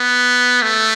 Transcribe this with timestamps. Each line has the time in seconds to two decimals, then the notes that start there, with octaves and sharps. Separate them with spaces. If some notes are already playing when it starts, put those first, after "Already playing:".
Already playing: B3
0.62 A3